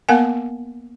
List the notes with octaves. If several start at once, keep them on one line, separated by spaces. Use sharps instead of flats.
A#3 B3 A#4 F5 F#5 G#5